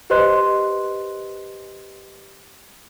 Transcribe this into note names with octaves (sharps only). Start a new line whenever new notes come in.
G4 B4 C5 D#5 C6 F#6